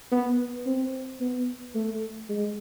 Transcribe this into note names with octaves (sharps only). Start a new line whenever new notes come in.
B3
C4
B3
A3
G#3